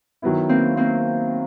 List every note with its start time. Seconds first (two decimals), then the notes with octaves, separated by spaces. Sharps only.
0.22 D#3 F#3 B3 E4
0.49 A#3 C4
0.77 A#3 C4